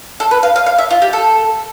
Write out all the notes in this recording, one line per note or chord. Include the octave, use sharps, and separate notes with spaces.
A4
B4
F5
F5
F5
E5
F4
G4
A4